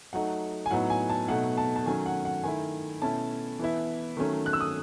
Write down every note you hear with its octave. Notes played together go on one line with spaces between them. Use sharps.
F#3 A3 D#4 F#5
G#5
A2 F#3 B3 D#4 F#5
G#5
A5
B2 F#3 A3 D#4 F#5
A5
A5
D#3 F#3 A3 C#4 G#5
F#5
F#5
D#3 A3 E4 G#5
B2 A3 C#4 E4 A5
E3 B3 E4
D#3 F#3 A3 C#4
F#6
E6
D#6